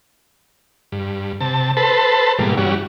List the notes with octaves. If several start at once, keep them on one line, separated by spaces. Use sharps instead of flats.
G2
C3 A5
A4 B4 C5 A5
G#2 B2 E3 G3 A#3
G2 E3 G3 C#4 F#4